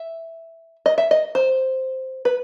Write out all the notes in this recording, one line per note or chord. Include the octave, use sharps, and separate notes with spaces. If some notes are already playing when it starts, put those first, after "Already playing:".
Already playing: E5
D#5
E5
D#5
C5
B4